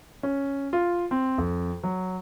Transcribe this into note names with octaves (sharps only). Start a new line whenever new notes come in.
C#4
F4
C4
F2
F#3